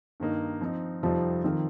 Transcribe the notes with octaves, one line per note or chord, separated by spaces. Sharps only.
G2 D#3 A#3 D#4
F3 C4 D#4
F2 C3 F3 G3 C4 D#4
D#3 F3 C4 F4 A#4